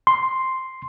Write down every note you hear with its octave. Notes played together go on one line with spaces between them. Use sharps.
C6